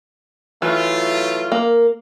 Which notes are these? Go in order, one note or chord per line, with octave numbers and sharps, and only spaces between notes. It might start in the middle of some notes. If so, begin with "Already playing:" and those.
E3 F#3 A3 F4
A#3